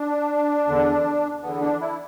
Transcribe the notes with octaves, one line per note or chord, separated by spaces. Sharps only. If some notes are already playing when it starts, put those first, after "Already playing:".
Already playing: D4
E2 D3
E2 D3 B3
D4
E4